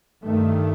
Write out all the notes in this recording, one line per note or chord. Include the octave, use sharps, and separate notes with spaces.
G2 D#3 A3